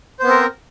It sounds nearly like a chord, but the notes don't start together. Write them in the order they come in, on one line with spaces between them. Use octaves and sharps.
C5 B3 C4 A#4